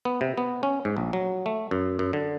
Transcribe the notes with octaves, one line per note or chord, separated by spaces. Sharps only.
B3
C3
B3
C#4
G#2
A#1
F#3
A3
F#2
F#2
D3